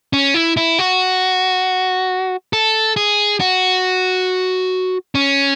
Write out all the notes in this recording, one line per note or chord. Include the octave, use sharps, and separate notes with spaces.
C#4
E4
E4
F#4
A4
G#4
F#4
C#4